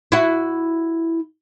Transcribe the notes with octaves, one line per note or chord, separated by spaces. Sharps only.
E4 F#4